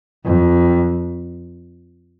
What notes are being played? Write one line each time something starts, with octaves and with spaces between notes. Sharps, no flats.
F2